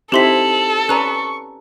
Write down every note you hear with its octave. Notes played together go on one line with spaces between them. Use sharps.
C4 D#4 E4 G4 A4 C6 B6 F#7
C#4 B4 D5 G#5 A#5 C#6 F#6